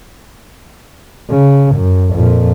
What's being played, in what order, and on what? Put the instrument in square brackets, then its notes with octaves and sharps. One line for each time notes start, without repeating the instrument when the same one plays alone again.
[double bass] C#3
F#2
F2 A#2